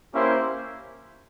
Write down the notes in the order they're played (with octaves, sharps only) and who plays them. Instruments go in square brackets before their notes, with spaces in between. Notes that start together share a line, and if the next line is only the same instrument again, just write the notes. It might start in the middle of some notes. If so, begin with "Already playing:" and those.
[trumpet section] A#3 C#4 E4 G4 C5